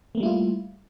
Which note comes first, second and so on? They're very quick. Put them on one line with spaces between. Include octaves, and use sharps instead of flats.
A3 A#3 G3 E4 F4